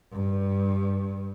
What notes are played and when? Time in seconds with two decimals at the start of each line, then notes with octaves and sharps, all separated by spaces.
0.12 G2